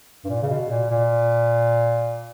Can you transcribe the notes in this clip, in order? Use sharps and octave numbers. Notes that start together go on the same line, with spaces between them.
G2
A#2
C#3
B2
A#2
A#2